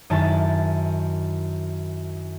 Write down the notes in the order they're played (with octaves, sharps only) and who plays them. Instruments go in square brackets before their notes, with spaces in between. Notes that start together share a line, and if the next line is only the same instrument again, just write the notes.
[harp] F#2 D#3 E4 A5 A6